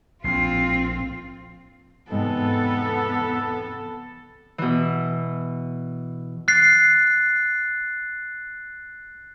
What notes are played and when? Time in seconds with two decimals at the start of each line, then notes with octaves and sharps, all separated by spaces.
0.24 A#1 A2 C4 F4 C7
2.10 E2 G#2 C3 B3 A4
4.58 B2 E3
6.48 F#6 A6 C7